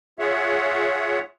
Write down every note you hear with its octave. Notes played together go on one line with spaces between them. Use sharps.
F4 G#4 C#5 E5 F#5